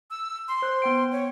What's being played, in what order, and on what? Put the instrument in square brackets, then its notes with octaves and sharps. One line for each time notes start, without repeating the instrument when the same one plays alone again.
[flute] E6
C6
[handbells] C5 F#6
B3 G5 D7
[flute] C#5